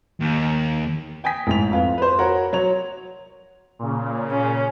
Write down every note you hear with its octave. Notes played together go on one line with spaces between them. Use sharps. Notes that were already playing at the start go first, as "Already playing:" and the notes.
D#2
G5 G#5 D#6 B6
A1 G#2 F7
F2 F4 B4
B4 C5
F#4 A#4 C#5 F#5
F#3 C#5 F7
A#2 C#3
C#4